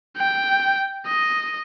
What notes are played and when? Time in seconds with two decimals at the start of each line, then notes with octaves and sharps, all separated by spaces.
0.17 G5
1.06 D#5